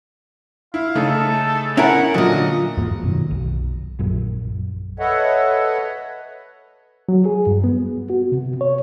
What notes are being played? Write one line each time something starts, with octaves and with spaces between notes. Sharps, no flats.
E4 F5
C#3 A3 D#4 A4
C#4 E4 A#4 F#5
A#2 D3 F#3 D#5
E2 G#2 A#3
F#2 B2 D#3
B1
A#1 F#2
A4 B4 C#5 D#5 E5 F#5
F#3
G#4
G2
B3
F#4
C3
C#5